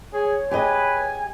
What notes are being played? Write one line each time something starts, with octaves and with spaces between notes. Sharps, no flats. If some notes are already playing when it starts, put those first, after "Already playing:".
G#4 C#5
G4 G#4 B4 D#5 G#5